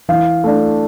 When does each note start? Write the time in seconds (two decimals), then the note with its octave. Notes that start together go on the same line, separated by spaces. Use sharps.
0.09 E3 F5
0.44 A3 D4